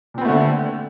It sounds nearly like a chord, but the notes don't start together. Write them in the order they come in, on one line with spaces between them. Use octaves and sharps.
A#2 C4 B3 A3 D3